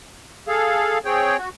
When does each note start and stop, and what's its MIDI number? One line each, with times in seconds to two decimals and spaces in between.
0.48 0.98 68
0.48 0.98 69
0.48 0.98 77
1.05 1.37 60
1.05 1.37 68
1.05 1.37 73
1.05 1.37 79
1.39 1.49 66